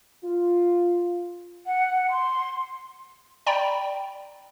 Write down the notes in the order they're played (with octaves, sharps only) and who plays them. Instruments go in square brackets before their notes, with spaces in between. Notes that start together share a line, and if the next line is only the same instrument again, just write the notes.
[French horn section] F4
[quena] F#5
C6
[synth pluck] D5 G5 A#5 B5